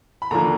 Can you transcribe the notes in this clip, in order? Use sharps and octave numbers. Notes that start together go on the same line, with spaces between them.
B5
D#2 D3 F3 A#3 A#5